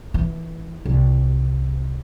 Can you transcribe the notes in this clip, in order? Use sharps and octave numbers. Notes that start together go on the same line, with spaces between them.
E3
C2